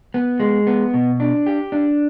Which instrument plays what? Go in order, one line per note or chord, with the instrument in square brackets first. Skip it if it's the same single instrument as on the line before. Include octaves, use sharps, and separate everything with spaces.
[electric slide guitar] B3
G#3
B3
B2
D4
G4
D4